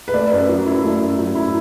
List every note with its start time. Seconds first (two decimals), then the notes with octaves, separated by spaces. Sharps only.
0.08 B4
0.14 A3 D5
0.32 F#2
0.49 F#3
0.66 E4
0.84 A3
1.01 F#2
1.18 F#3
1.35 E4